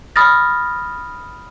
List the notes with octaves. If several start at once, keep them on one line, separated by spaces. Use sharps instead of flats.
B5 D#6 F6 A6 A#6